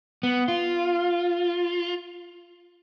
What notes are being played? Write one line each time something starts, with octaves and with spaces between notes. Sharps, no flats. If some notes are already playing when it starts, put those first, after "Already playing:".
B3
F4